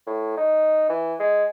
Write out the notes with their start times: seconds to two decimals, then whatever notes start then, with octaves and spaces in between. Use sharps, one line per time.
0.07 A2
0.37 D#4
0.89 E3
1.19 G#3